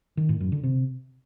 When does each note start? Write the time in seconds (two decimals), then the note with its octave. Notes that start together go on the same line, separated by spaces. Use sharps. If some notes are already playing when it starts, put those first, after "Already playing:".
0.17 D#3
0.29 A2
0.40 F#2
0.52 D3
0.63 C3